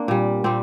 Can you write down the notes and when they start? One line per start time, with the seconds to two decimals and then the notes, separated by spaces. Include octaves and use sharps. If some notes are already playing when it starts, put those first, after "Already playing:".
Already playing: A#3 C4 D4
0.08 A#2 G3
0.44 A#2 G3 C4